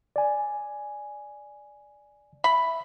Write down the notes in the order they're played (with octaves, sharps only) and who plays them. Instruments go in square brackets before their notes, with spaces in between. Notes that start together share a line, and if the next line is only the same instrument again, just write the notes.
[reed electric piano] D5 G#5
[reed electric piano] E5 [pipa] B5